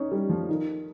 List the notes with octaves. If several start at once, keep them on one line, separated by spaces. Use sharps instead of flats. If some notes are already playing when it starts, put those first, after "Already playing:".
Already playing: C#4 D#4
G3
F3
D#3